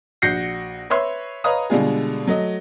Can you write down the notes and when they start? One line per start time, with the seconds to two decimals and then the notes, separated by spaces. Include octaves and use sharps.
0.22 A#1 F#4 G6 A#6 C7 C#7
0.90 B4 C#5 E5 C6
1.44 B4 C#5 D#5 F5 A#5 D#6
1.70 B2 D3 G3 G#3 F4 G#4
2.27 F#3 A3 D#5